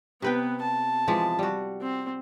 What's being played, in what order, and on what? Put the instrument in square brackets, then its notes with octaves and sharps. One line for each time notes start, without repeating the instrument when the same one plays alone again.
[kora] C3 B4 G5 [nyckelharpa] B3
[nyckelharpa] A5
[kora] E3 F3 G#3
G3 F#4
[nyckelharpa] C4